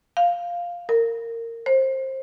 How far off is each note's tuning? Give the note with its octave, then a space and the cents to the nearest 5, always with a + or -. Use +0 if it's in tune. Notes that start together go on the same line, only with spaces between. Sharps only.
F5 +0
A#4 -20
C5 +25